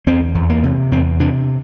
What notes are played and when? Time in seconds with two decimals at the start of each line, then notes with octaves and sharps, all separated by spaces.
0.07 E2 C4
0.35 E2
0.50 A#3
0.64 C3
0.91 E2 C4
1.20 C3 D4